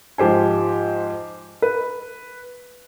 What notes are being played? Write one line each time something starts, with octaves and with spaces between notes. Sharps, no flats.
G#2 F3 G4 C5 G#5
B4